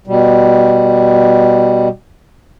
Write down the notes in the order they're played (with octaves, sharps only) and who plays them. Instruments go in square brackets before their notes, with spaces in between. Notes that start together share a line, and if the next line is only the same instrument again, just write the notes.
[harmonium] B2 G3